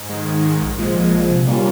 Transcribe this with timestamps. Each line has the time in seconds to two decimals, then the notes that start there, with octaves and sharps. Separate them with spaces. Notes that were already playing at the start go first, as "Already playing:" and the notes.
Already playing: G#2
0.10 D#3 G#3
0.27 G#2
0.45 D#3 G#3
0.61 A#1
0.79 A#2 F3 G#3
0.96 A#1
1.13 A#2 F3 G#3
1.30 C3
1.47 G3 A#3 C#4 F4